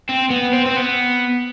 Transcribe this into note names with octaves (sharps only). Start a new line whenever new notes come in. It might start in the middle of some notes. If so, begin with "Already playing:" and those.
C4
B3
C4
C4
B3